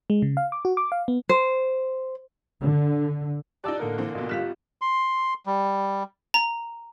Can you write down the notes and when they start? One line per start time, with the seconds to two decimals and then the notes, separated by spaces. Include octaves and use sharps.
0.10 G#3
0.22 C#3
0.37 F5
0.52 D6
0.65 F#4
0.77 D6
0.92 F5
1.08 B3
1.29 C5
2.61 D3
3.64 D#4 F4 G4 D5 A5 E6 F#6
3.80 A2 D3 A#3 A4 A#4
3.98 A#2 E3 C4
4.15 A1 B2 F4
4.29 G#1 G3 F4 G4 F5 F#6 B6 E7
4.82 C6
5.46 G3
6.34 A#5